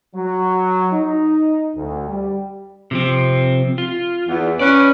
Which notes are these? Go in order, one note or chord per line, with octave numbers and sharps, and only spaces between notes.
F#3
D#4
D2
G3
C3 F3 C4
F4
E2
C#4 B4 D5